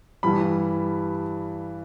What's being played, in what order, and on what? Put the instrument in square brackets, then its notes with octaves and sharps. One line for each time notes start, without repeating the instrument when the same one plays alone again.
[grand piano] G2 E3 G3 B5